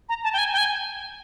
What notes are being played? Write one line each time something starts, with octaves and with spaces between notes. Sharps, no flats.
A#5
A5
G5
G#5
G5
G#5